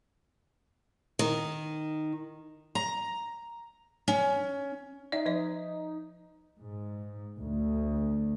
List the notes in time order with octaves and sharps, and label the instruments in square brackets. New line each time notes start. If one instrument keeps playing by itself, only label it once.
[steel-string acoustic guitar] D#3
A#5
C#4
[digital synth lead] D#4 [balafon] D5 E5
[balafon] F3 D5 D#5
[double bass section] G#2
D2